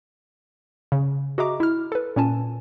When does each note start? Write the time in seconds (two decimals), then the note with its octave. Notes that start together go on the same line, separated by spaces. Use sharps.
0.92 C#3
1.38 F#4 G#4 D#5 E5 A#5 D6
1.60 E4 F6
1.92 A4 B4
2.16 A#2 C#4 G#5 A5